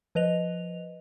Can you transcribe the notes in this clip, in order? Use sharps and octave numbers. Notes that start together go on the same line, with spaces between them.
F3 B4 D#5 F7